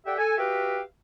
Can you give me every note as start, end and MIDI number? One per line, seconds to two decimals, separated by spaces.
0.06 0.17 67
0.06 0.17 69
0.06 0.17 74
0.06 0.17 76
0.06 0.17 78
0.06 0.17 79
0.18 0.37 69
0.18 0.37 80
0.38 0.82 66
0.38 0.82 67
0.38 0.82 71
0.38 0.82 76
0.38 0.82 77
0.38 0.82 79